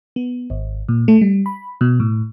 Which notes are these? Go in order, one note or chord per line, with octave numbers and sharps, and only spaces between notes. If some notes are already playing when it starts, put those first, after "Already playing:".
B3
G#1
A#2
A3
G3
B5
B2
A2